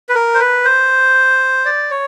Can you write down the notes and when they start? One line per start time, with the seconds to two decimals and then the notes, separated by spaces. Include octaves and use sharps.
0.09 B4
0.15 A#4
0.35 C5
0.40 B4
0.65 C5
1.65 D5
1.91 C#5